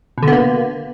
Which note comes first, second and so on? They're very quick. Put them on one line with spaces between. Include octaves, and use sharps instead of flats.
B2 D3 B3 A#3